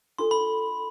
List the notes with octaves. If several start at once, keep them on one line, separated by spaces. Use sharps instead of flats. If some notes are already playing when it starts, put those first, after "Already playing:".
D4 F4 A4 C6
B5